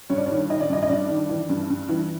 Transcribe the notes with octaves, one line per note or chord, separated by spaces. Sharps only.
G2 C#5
D5
C#5
D#3
D#3 D#5
D5
G2 D#5
D#5
G2 D5
D#3
E3
G2
G2
E3